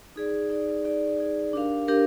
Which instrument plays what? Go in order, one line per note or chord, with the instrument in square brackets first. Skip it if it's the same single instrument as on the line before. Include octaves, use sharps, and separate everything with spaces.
[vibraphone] D#4 G#4 D5
D#4 G#4 D5
D#4 G#4 D5
D#4 G#4 D5
D4 G4 A#4 F5
D4 G4 A#4 F5